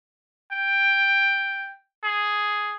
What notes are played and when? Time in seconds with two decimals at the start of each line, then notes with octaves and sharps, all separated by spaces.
0.52 G5
2.04 G#4